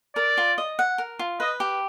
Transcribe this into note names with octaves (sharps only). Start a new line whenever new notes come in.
A#4 D5
F4
D#5
F#5
A#4
F4
B4 D#5
G4